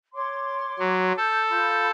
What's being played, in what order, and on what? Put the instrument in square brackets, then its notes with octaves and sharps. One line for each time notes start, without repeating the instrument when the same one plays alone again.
[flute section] C#5 C6 D6
[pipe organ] F#3
[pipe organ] A4 [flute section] G6
[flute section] F4 B5 G6